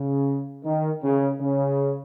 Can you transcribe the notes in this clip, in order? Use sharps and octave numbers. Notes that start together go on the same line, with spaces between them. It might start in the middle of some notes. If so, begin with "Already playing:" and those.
Already playing: C#3
D#3
C#3
C#3